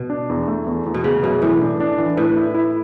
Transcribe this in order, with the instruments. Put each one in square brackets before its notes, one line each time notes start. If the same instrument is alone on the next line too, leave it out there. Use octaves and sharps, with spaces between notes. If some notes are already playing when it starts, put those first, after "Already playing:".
Already playing: [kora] B2
[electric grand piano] D4
E2
A3
E2
E2
[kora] B2
[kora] C#3 [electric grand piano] B3
[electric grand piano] F#2 [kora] B2
[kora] A2 [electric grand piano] E3
[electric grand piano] D4
D4
E3
[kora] A2 [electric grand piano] B4
[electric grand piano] E4
E4